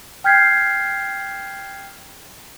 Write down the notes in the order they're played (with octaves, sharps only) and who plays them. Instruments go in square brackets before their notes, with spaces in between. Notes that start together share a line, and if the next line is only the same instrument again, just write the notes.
[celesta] G5 F6 G6 G#6 B6 C7